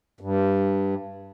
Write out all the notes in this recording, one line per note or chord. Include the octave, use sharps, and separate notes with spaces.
G2